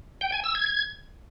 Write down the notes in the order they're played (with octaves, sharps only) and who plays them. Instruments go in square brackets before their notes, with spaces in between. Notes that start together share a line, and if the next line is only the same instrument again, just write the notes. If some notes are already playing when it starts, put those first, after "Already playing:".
[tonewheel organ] G5
G#5
E6
G#6
G#6